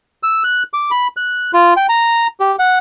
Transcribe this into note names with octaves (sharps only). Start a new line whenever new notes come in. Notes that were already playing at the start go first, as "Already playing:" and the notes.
E6
F#6
D6
B5
F#6
F4
G5
A#5
G4
F#5